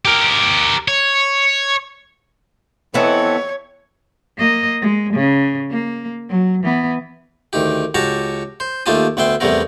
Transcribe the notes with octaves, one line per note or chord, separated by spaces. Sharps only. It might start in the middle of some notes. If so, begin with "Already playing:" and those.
G4 A#4
C#5
E3 B3 C4 E4 A4 C#5 D#5
A#3 D#5
G#3
C#3
A#3
F#3
E3 B3
D2 D#3 G4
C#2 F#4 G4 A5 A#5 C#6
C5
D#2 A3 F4 G4 A5 D#6
D2 B3 E5 G5 C6
E2 C3 G3 A3 B3 A#4